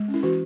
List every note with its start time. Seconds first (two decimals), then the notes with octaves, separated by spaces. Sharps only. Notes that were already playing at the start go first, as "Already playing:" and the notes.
Already playing: G#3
0.08 C#4
0.14 E4
0.23 E3 F#4